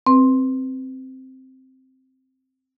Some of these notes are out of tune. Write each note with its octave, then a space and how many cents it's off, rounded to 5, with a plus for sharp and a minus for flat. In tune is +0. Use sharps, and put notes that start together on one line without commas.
C4 +0 B4 +0